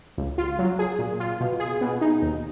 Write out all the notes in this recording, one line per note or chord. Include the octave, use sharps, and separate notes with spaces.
C#2
F4
F#3
G#4
A#2
F4
B2
G#4
B2
D#4
D#2